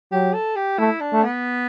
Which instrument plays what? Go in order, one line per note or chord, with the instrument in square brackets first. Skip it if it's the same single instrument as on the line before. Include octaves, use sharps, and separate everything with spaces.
[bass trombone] F#3 [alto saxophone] G4
[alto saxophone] A4
G4
[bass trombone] A3 [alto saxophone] E4
[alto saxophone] D4
[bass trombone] A3
[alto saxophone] B3